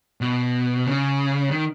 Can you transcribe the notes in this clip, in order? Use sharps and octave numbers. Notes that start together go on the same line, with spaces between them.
B2
C#3
D#3